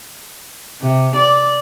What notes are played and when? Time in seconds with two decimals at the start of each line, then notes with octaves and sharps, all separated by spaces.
0.82 C3
1.16 D5